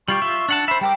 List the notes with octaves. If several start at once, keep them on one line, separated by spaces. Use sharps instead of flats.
G3 F4 G4 C#6
F4 E5
D4 F#5 A5
C5 E5 B5
G3 A#4 G5 D6